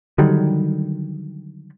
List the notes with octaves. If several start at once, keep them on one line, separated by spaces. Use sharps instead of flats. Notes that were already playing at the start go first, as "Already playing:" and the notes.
D3 D#3 F#3 G3